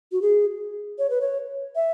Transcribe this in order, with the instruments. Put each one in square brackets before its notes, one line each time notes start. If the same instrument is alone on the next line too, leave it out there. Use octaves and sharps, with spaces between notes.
[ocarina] F#4
G#4
C#5
B4
C#5
E5